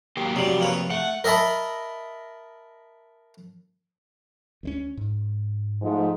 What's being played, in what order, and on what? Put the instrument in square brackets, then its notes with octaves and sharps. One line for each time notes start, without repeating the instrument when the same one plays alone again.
[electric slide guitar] F#3 A#3 G4
[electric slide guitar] F2 C3 [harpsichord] F#3 G3
[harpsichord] A#3 B4 C#5
[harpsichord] A3 [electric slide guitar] F#5
[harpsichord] A#4 D#5 E5 A5 B5
[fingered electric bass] D2 G#3 C#4
G#2
[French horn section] G#2 F3 A3